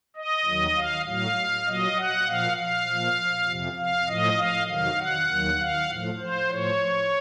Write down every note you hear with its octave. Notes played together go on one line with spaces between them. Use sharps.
D#5
D#2 D#3 F#3
F5
A2 F#3 F5
A#2 F#3 D#5
F#5
A#2 F3 F5
F5
A#2 F3
F2 C3 F3
F5
A2 F3 D#5
F5
F2 C3 D#3 F#3 F5
F#5
D#2 D#3 F#3
F5
A2 F3
C5
A2 F3 C#5